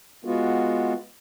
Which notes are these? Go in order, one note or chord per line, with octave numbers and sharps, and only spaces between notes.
G#3 B3 F4 F#4